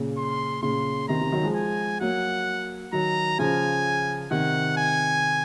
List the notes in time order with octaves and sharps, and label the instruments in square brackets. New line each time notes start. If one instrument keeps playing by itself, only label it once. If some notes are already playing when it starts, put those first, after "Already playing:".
Already playing: [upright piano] A#2 C#3
[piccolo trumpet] C6
[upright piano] A#2 C#3 [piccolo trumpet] C6
[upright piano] C3 D#3 [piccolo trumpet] A#5
[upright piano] C3 D#3
D#3 F#3
F3 G#3
[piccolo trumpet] G#5
[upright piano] F#3 A#3 [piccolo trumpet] F#5
[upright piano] D#3 F#3 [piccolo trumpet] A#5
[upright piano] C#3 F3 [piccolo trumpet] G#5
[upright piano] C3 D#3 [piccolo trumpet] F#5
[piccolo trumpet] G#5